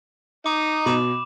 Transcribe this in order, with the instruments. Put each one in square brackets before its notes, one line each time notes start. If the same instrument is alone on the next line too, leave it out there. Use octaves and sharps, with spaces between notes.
[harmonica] D#4 [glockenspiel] D6
[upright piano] B2 [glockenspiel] B5 D6 E7